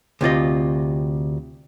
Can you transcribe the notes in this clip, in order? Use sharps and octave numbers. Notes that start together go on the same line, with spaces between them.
D2 C3 F4 D#5